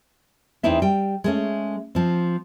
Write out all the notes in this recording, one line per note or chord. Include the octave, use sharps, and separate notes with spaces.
E2 C4 D#4 E4 E5
G3 G5
G#3 A3 C#4
F3 C4